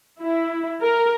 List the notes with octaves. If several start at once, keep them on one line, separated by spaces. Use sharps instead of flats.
E4
A#4